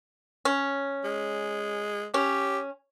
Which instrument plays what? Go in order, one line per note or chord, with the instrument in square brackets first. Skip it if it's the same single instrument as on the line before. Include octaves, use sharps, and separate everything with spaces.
[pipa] C#4
[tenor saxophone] G#3
[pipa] C#4 [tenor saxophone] G4